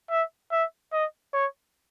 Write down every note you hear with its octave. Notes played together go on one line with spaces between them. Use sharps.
E5
E5
D#5
C#5